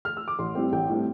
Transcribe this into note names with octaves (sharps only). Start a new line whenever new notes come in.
F6
E6
D6
A1 C6
A2 G3 C4
A1 G5
A2 G3 C4